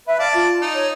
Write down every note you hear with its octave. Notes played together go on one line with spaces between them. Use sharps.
B4 E5
D5 F5 A5
F4
D#4
C#5